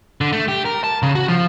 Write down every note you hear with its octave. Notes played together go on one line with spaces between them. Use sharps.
D3
A3
G4
A#4
A5
C#3
F#4
F3